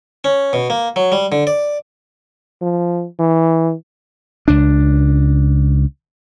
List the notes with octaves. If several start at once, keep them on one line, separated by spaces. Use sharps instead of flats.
C#4
B2
A#3
F#3
G3
D3
D5
F3
E3
C#2 D4